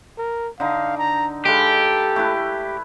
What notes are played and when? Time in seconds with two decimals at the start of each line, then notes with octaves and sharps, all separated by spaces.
0.18 A#4
0.60 D3 D#4 F5
0.97 A#5
1.45 G#3 G4 A4 B4 F5
2.16 A3 E4 B4